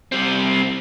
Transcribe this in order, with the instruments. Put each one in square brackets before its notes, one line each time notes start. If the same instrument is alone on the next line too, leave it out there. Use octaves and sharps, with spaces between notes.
[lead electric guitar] G3 C4